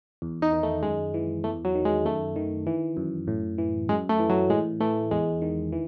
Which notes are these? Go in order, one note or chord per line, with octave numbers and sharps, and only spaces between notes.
E2
D#4
D#3
A3
F#2 G#3
E3
E2 A3
F#3
D#3
G#3
F#2 A3
D#3
E3
F#2
A2
E3
F#2 G#3
A3
E3
F#3
A2 G#3
E3 A3
E2 G#3
D#3
E3